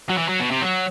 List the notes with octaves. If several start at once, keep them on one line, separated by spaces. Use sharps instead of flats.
F#3
E3
F#3
B2
C3
F#3